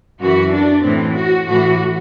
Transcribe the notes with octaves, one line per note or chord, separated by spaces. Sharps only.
F#2 E3 F#4
D4
A2 E3 C4
F#4
A2 E3 F#4